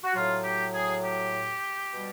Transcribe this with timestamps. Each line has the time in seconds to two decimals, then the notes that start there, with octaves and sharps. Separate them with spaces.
0.03 F#4
0.14 A2 F#3 F4
0.44 G4
0.73 G#4
1.03 G4
1.93 B2 G3